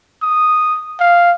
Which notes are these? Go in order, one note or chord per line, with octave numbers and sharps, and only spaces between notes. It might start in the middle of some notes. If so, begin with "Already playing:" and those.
D#6
F5